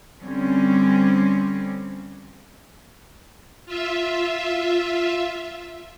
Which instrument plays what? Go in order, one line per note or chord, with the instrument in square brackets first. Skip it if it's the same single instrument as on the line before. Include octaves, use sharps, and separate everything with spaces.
[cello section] D3 G3 C4 C#4
[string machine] F4 E5